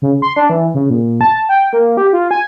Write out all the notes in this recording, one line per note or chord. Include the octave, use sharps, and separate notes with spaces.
C#3
C6
D4
E3
C#3
A#2
A5
G5
A#3
G4
F4
G#5